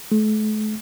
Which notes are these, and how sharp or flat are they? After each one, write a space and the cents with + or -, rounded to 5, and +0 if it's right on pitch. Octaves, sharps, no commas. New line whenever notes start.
A3 -40